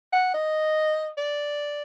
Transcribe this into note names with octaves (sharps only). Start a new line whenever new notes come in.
F#5
D#5
D5